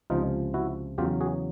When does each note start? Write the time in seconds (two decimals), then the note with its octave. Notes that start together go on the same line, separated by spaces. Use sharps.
0.10 C#2 C3 F3 D#4 F4
0.54 E4 F#4
0.98 E2 C#3 F#3 F4 G4
1.21 F#4 G#4